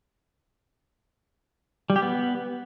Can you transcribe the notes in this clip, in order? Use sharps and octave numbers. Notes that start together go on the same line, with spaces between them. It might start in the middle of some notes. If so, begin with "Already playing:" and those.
G3
G4
B3